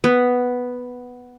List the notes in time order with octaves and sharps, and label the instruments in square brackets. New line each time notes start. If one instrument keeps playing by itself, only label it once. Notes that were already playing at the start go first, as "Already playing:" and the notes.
[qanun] B3